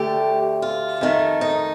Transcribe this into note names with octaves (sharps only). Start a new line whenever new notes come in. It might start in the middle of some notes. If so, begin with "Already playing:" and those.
Already playing: D2 D3 A3 G4
F4
F2 D#3 A3
D#4